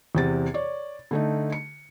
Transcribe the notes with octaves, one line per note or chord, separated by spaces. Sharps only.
E2 C3 A6
C#5 D5
D3 A3 D#4
C#7